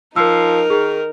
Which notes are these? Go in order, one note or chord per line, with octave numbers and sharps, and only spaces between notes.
F3 D#4 A#4 E6 C7
D#3 G#4